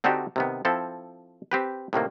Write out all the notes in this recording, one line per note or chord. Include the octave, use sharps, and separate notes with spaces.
D3 C4 D4 D#4 F#4 G4
C3 D#3 B3
F3 C4 E4 A4
C4 G4 B4
A2 C3 D#3 A#3